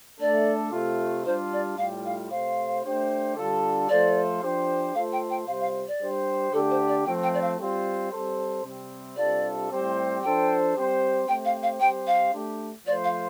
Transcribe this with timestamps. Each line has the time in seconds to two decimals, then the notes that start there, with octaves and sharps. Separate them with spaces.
0.20 A3 D4 A4 D5
0.72 C3 A3 F4
1.25 G3 D4 F4 C5
1.53 D5
1.78 A2 G3 F4 F5
2.05 F5
2.31 C3 A3 F4 C5 F5
2.85 A3 D4 G4 C5
3.36 D3 G3 D4 F4 A4
3.89 F3 A3 F4 A4 C5 D5
4.42 F3 D4 G4 C5
4.95 A3 F4 A4 C5 F5
5.13 G5
5.30 G5
5.47 C3 G3 F4 C5 F5
5.60 F5
5.88 D5
6.01 G3 D4 G4 C5
6.53 D3 A3 D4 G4 A4
6.71 C5
6.88 D5
7.06 F3 A3 C4 G5
7.23 G5
7.34 D5
7.42 F5
7.59 G3 C4 F4 C5
8.11 G3 C4 A4 C5
8.64 C3 G3 C4
9.17 C3 G3 D4 F4 A4 D5
9.70 A2 G3 C4 G4 C5
10.23 F3 D4 A4 C5 G5
10.76 G3 C4 G4 C5
11.28 A3 C4 G4 C5 G5
11.45 F5
11.63 F5
11.80 G3 C4 G4 C5 G5
12.07 F5
12.33 A3 D4 G4
12.87 F3 A3 F4 C5 D5
13.04 F5